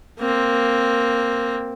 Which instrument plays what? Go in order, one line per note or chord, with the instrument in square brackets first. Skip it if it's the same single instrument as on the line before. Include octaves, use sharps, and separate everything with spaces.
[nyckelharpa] A#3 C4